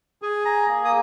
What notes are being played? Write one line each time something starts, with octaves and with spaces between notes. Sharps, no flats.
G#4 G#5
A#5
A#3
D#6